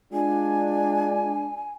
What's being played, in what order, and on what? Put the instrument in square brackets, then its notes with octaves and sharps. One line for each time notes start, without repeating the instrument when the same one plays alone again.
[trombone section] G#3 D4 [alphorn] F4 [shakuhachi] G#5